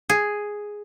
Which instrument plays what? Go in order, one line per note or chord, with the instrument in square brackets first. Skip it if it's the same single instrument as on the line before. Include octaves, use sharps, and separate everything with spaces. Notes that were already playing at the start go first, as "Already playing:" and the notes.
[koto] G#4